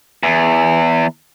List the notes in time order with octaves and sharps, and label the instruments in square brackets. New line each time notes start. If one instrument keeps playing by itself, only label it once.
[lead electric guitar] E2